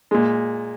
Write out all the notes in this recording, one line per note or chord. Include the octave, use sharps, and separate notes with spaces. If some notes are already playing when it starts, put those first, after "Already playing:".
A#2 G#3